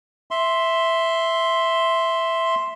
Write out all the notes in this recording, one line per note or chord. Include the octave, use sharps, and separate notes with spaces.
E5 C6